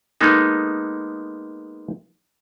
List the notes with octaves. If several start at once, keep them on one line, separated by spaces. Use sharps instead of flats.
G#3 A#3 B3 D#4 A4